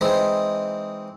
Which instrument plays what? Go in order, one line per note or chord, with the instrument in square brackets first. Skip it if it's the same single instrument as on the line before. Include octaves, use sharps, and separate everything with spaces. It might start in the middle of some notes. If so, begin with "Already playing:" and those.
[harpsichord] E3 G#3 C4 D#4 G#4 C5